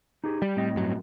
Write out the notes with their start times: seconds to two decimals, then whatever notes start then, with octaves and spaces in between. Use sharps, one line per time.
0.24 D#4 G4 G#4
0.42 G3 D5
0.56 A2 C4 D#5
0.76 G2 F#3